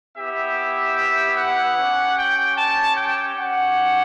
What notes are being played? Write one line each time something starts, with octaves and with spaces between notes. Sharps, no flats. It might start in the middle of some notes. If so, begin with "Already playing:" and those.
B3 E4 G4 E5
E5
F#5
C#4 G4
G5
A5
G5
C#4 G4 F#5